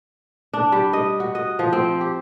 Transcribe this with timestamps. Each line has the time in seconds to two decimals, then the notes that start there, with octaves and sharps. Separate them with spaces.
0.53 D4
0.72 G3
0.93 D#5
1.20 F#4
1.35 D#5
1.59 F3
1.73 C4
2.01 G4